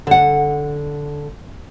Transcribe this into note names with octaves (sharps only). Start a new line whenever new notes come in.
D3 F#5